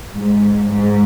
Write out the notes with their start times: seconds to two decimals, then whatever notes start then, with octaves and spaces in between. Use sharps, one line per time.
0.15 G#2
0.69 G#2